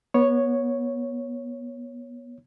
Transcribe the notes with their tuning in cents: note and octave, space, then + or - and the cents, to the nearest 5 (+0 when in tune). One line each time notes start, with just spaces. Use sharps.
B3 -30 C#5 +0